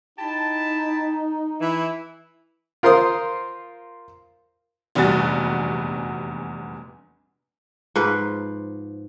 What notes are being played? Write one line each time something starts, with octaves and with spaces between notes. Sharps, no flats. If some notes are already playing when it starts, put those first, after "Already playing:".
D#4 E4 G5 A5
E3 E4
F4 A#4 C5 C6 D#6
F1 A#1 E2 G3 F#4 A6
G#2 F3 B4